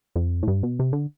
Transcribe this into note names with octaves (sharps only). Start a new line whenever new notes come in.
F2
A2
G2
B2
C3
D3